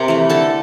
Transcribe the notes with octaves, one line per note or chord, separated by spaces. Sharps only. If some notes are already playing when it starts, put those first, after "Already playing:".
Already playing: C3 A#4 A#5
E3 A3
D3 A4 A5